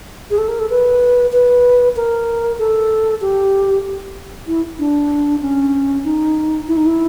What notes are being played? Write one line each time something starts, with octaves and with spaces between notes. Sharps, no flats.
G#4
A4
A#4
A4
B4
B4
A#4
A4
G4
E4
D4
C#4
D#4
E4
D#4
E4